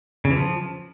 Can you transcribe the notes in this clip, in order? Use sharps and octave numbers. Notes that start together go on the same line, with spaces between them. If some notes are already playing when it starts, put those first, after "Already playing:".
C#3
E3
F3